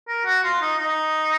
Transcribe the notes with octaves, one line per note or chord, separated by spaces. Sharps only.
A#4
F#4
F4
D#4
D#4